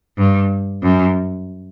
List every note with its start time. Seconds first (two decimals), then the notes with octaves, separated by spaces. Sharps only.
0.18 G2
0.83 F#2